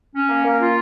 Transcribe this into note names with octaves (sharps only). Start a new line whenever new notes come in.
C#4
A#3
A#3
F4